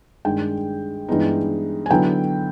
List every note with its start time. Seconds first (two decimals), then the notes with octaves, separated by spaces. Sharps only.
0.25 G2 D#3 G#3 G5
1.08 G2 E3 G#3 B3 D#4
1.86 G#5
1.90 D3 F#3 B3 E4 G5